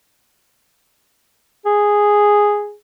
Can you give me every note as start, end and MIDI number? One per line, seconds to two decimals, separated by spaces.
1.66 2.74 68